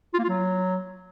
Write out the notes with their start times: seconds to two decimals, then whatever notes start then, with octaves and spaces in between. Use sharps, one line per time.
0.14 F4
0.19 A#3
0.24 F4
0.29 F#3